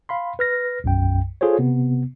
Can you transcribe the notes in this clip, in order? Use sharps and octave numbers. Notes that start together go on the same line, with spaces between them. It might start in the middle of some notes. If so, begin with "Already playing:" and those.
F5 B5 C6
B4 F6 A#6
B1 F#2 G5
F4 G#4 A4 C5 C#5
C3 B3